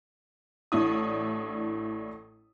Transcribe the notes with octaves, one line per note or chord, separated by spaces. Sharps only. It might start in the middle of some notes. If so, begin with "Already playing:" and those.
A1 A2 D4 E4 D#6